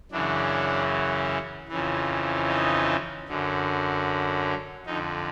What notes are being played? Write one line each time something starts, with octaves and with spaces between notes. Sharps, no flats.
F#2 C#3 E3 D4
F2 C#3 E3
D#4
F#2 D3
F2 D3 D#4